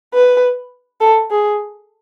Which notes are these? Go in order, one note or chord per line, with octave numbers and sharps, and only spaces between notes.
B4
A4
G#4